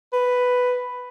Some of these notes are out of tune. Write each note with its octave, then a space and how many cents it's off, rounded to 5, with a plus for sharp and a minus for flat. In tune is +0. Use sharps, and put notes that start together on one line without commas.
B4 +5